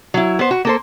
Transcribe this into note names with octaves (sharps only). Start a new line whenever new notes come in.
F#3 E4
B3 C5
F#4
A#3 A4 C5